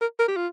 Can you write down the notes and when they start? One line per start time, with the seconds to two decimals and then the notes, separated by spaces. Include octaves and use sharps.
0.01 A#4
0.19 A#4
0.28 G4
0.36 F4